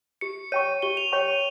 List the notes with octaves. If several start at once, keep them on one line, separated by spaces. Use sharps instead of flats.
G4 C#7
C#5 G5 C#6 D#7
G4 G7
F7
C#5 G5 C#6 D#7
D#7